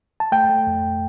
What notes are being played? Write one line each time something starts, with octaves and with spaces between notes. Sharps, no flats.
A5
A3 G5
A3
F2